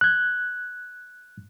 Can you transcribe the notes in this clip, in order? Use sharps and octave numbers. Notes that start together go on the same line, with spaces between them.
F#6 G#6